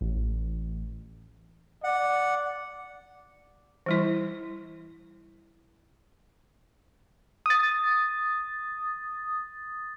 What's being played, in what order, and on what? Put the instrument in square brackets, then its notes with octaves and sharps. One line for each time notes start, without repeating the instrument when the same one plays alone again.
[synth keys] A1
[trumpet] D5 [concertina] F#5
[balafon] E3 G3 E4
[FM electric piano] D#6 A6